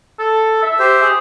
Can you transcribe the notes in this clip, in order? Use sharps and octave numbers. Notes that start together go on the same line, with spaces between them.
A4
E5
G4 C5
G#4